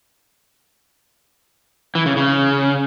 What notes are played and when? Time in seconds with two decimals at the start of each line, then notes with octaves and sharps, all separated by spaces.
1.95 E3
2.06 C#3
2.17 C#3